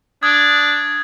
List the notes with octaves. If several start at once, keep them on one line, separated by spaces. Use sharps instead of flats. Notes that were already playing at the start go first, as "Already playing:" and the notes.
D4 D#6 G#6